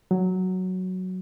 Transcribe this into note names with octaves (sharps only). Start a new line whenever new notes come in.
F#3